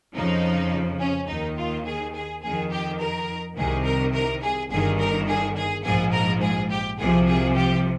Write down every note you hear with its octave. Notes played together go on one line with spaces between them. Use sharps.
F2 C#3 F3 D#4
C#4
D#2 D#3 D#4
F4
G#4
G#4
F2 D#3 G#4
G4
A#4
C2 C3 D#3 G#4
A#4
A#4
G#4
G1 G2 D#3 G#4
A#4
G#4
G#4
A#1 G#2 F3 G#4
A#4
G#4
G4
C2 C3 F3 G#4
G#4
G4